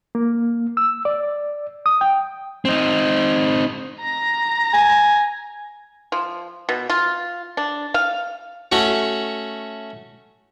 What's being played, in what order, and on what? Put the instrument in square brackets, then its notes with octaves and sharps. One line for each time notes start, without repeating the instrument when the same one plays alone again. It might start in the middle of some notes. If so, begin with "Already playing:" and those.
[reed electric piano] A#3
E6
D5
D#6
G5
[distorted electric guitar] C4 D#4
[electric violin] A#5 A#6
[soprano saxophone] G#5
[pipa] F3
B2
F4
D4
F5
[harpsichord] A3 C#4 F#4 F#5